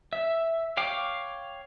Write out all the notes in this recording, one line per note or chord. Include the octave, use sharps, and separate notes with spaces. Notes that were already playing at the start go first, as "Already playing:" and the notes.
E5
C#5 F5 G5 D6